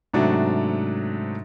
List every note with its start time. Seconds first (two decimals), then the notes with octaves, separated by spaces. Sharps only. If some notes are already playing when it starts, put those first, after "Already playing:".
0.14 G#2 C3 F#3 A3 D4 F#4